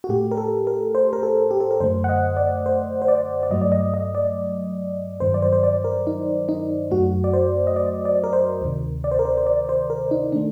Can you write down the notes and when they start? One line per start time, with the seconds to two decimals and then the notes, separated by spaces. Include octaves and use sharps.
0.04 F#4
0.09 A2 A3 G4
0.31 A#4
0.37 A4
0.67 A#4
0.95 C5
1.13 A#4
1.23 A4
1.51 G4
1.60 A4
1.71 A#4
1.80 F#2 D3 A3 C5
2.04 F#5
2.09 D#5
2.37 D5
2.66 C5
3.02 C5
3.08 D5
3.43 D5
3.50 G2 F#3 A3 D#5
3.61 D5
3.72 D#5
3.94 D#5
4.15 D5
5.20 G2 D#3 F#3 C5
5.34 D5
5.42 C5
5.53 C5
5.63 D5
5.84 A#4
6.07 D#4
6.49 D#4
6.91 F#2 F#3 A3 F#4
7.24 D5
7.33 C5
7.67 D#5
7.76 D5
8.05 D5
8.24 A#4
8.33 C5
8.62 D2 C3 D#3
9.04 D5
9.11 C5
9.19 A#4
9.25 C5
9.37 C5
9.47 D5
9.69 C5
9.90 A#4
10.11 D#4
10.32 D#3 A3 D4